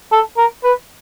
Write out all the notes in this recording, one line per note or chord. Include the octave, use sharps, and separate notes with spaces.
A4
A#4
B4